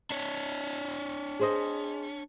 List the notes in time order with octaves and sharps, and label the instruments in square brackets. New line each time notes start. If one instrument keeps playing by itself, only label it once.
[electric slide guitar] D4 C#5
[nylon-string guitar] G#4 C5 D#5